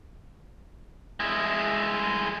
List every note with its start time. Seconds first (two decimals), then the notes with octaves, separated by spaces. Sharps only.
1.20 G#3 E4